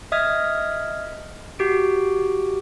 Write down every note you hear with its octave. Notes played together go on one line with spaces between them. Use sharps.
D#5 E5 D#6 F6 G#6
F#4 G4 D7